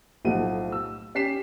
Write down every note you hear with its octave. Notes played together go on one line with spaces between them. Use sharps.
B1 A2 F3 F#5 D#7
E6
C#4 G4 B6 C7 E7